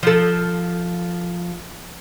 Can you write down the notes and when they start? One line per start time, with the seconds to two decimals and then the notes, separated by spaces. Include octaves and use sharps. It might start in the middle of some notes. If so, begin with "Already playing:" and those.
0.03 F3 A4